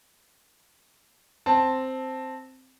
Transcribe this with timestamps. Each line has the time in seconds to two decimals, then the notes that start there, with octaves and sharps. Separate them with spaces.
1.46 C4 A5